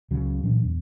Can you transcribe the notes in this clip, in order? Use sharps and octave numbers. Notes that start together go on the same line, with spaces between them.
C#2 C#3 F#3
A#2 E3 F#3 D4
E2